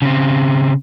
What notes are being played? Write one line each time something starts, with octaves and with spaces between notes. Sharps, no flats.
C#3 C4